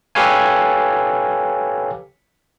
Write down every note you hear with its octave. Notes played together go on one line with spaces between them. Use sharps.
G4 A4 B4 C#5 F5 G#5